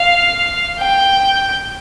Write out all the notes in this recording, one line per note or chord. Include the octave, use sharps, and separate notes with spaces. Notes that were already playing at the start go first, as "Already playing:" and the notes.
Already playing: F5
G5